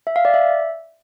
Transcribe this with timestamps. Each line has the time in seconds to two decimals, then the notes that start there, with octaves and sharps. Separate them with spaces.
0.07 E5
0.16 F5
0.25 D5
0.34 E5